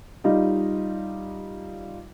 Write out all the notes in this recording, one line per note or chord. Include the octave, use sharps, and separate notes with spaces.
G3 D#4 F4 D#5